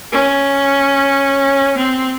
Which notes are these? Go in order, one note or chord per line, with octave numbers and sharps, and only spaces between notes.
C#4
C4